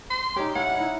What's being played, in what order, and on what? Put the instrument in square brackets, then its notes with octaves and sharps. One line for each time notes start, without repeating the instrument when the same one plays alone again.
[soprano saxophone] C6
[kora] C#4 D#4 [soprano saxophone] G4
[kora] C#4 E4 [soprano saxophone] F#5
[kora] D#4 E4